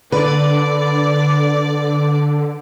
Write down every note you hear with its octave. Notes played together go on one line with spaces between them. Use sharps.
D3 B4 D5